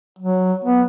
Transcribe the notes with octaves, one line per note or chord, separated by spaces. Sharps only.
F#3
B3